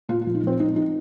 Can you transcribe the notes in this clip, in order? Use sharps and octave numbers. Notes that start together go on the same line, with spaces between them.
A#2 F4
F4
A#1
D#4
A#1 C4
A#1 D#4
D#4